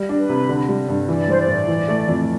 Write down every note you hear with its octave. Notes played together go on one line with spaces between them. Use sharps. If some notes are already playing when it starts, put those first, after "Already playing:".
Already playing: G3
D4
B4
C3
D3
G3
G2
E3 D5
G3 C5
D5
A2
E3
A3
F2